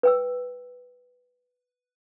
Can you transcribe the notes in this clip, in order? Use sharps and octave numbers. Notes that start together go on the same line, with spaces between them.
B4 G5 E6